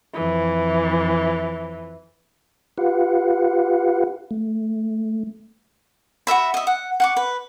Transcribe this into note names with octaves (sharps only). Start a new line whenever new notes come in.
F2 E3
F4 G4 B4 F5 F#5
A3
F#4 A#4 E5 B5
D#5 E5
F#5
F#5 C#6 D6
B4